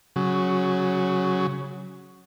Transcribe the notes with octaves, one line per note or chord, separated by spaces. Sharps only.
C#3 F#3